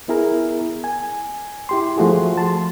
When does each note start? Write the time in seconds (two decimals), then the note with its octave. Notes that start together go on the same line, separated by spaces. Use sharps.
0.08 B3 E4 G#4 A#4
0.84 G#5
1.69 E4 G4 C6
1.97 F3 A3 F#4 G#4
2.37 A5 C6